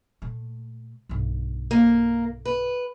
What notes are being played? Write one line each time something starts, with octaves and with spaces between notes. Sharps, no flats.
A#2 A3
B1 G2
A#3
B4